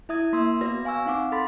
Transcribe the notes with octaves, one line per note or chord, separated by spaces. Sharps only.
E4 E5 D#6 G#6
A#3 C6 D#6 E6
B3 F#4 B4 D5 A#6
F5 G#5 C#6 E6
C4 D#4 F5 F#5 D6
A4 B5 C6 A6 B6